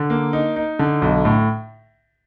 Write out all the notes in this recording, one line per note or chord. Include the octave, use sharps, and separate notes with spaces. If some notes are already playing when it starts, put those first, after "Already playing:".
Already playing: D3
A#3
D#4
D#4
D3
B1
A2